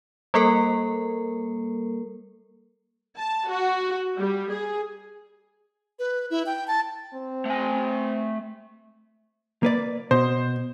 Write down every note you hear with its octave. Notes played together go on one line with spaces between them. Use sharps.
G3 A#3 A4 A#4
A5
F#4
G3
G#4
B4
E4
G5
A5
C4
A3 G#5
A#3 B4 D5
B2 C5